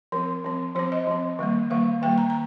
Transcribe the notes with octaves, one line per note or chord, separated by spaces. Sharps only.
F3 C4 A#4
F3 C4
F3 C4 C5
D#5
F3 C4
D#3 G3 A#3
D#3 G3 A#3 F5
D#3 G3 A#3 G5
A#5
A#5